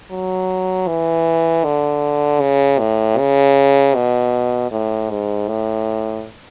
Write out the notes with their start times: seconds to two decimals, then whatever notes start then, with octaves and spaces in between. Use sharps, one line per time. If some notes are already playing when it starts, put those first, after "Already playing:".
0.11 F#3
0.87 E3
1.64 D3
2.41 C#3
2.80 A2
3.18 C#3
3.95 B2
4.71 A2
5.10 G#2
5.48 A2